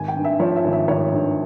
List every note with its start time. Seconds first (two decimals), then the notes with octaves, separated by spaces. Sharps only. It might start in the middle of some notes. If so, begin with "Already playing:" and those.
Already playing: G#1 G#5
0.08 G5
0.17 G2
0.25 E5
0.39 F3 C#5
0.56 E5
0.64 G#1
0.73 E5
0.88 G#1 C#5
1.12 G2